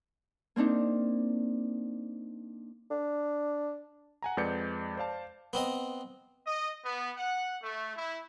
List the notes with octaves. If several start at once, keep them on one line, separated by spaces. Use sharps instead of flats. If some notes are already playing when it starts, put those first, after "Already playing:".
A#3 C4 D4 D#4
D4
F#5 G#5 A#5
F2 G#3 B4 D5 G6 C#7
C5 D5 F5 A5
B3 C4 D#5
D#5
B3
F#5
A3
E4